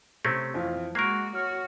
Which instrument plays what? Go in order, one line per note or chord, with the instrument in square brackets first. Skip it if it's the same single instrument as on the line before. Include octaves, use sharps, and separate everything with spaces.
[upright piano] C3 [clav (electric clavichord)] A3 C4 C#4 [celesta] G#6
[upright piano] F2 F4 F5 [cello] E3
[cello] G#3 F#4 [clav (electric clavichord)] A#3 A#4 [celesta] C#6 F#6 C7 [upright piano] G#6
[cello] F#4 C#5 [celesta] F6